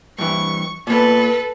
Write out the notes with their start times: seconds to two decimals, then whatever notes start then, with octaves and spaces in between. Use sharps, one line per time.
0.18 G2 E3 C#6
0.87 A#2 B3 A4 B4